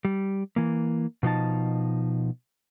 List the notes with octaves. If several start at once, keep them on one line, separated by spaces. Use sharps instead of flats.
G3
E3 A#3
B2 F3 D#4 A5